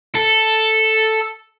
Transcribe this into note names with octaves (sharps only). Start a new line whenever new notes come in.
A4